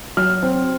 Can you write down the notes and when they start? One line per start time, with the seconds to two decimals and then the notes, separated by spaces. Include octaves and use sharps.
0.17 F#3 F6
0.43 C4